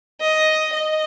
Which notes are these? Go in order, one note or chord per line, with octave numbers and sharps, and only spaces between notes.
D#5
D#5